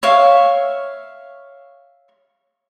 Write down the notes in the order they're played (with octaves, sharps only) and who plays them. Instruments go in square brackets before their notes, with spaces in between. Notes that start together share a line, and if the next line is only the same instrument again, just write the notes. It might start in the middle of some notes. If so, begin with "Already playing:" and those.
[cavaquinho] C#5 E5 F5